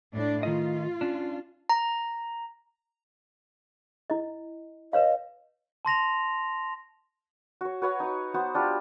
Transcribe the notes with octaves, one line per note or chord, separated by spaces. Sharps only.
A2 D4
D#3 A3 F4 D#5
C#4 D4
A#5
E4 D#5
B4 C#5 D#5 F5
A5 C6 A#6 F7
F#4 C#5
F#4 B4 C#5 F#5
D#4 C#6
B3 F#4 C5 F#5
D4 F4 G4 B5